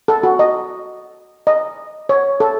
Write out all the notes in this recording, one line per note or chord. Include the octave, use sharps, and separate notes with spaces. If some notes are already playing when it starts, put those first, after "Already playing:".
A4
F#4
D#5
D#5
C#5
A4